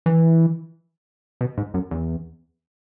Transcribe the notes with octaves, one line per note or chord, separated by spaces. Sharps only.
E3
B2
G#2
F#2
E2